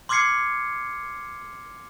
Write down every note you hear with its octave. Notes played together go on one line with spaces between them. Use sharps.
C6 D6 F6 G#6 C7 C#7